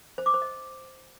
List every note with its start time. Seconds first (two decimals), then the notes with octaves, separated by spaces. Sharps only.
0.18 C5
0.26 D6
0.34 C5
0.42 D#5